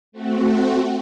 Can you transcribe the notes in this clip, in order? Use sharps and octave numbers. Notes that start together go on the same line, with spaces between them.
A3 C4 F#4